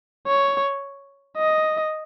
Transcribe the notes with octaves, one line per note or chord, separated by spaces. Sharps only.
C#5
D#5